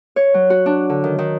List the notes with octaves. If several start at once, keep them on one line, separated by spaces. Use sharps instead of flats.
C#5
F#3
F#4
D4
D3
D#3
D#3